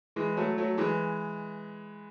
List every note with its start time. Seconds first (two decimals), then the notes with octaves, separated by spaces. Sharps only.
0.16 E3 G#3
0.37 F#3 A3
0.57 F#3 A3
0.78 E3 G#3